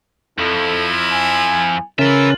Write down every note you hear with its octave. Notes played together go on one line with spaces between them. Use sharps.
F2 F3 E4 A4
G#5
C#3 C#4 F4 A#4 B4 E5